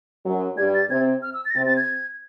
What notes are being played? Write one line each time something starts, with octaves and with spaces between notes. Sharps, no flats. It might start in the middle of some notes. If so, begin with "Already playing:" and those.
F#2 F#3
G2 G3 G#6
A6
C3 C4 G#6
F6
E6
A6
A#6
C3 C4 A6
A6
G#6